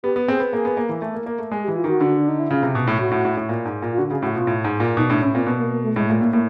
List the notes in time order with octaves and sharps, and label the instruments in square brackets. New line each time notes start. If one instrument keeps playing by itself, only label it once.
[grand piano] B3 [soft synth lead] G4
[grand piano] B3
[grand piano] C4 [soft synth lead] G#4
[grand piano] B3
[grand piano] A#3 [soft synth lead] G#4
[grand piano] B3
A#3
E3
A3
A#3
A#3
A3
[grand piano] G#3 [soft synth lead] G#4
[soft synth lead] G4
[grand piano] E3
[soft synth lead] F4
[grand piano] D#3 [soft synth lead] F#4
[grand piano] D3
[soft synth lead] D4
D#4
E4
[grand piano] C#3 [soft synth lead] F4
[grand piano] C3
B2
A2
[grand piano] A2 [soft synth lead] F#4
[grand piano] A2
A2
A2
A#2
G#2
A#2
[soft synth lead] F4
[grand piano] D3 [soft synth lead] F#4
[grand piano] C#3 [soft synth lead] G#4
[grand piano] A2 [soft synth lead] F#4
[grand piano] B2 [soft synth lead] F4
[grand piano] A2
G#2
A#2
[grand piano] B2 [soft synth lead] D#4
[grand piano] A2 [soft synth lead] D4
[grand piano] A2 [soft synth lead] C#4
[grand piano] A#2 [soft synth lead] C4
[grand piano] B2 [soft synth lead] B3
[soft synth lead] A#3
A#3
A3
[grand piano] A2 [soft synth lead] G#3
[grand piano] A#2 [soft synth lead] A3
[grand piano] A2 [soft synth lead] A#3
[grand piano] A2 [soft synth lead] A#3